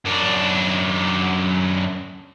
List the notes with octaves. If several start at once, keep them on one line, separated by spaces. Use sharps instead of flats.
F#2 D4